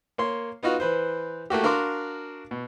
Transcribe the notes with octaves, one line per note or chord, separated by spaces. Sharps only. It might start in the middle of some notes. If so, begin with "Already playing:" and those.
A#3 C#5 C6
B3 D#4 F4 F#4
E3 B4 C5
A3 A#3 F#4 G4
D4 F#4 A#4 F5 C6 D6
B2